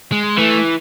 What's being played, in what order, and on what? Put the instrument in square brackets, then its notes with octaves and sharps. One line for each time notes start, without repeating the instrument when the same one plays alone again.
[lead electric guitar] G#3
[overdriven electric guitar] E3 [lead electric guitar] A3